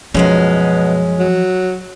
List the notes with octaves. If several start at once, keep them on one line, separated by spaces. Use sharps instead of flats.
F#2 B2 F3 G#3 C#4
F#3